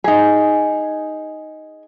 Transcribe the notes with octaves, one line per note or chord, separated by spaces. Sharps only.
D#4 G#4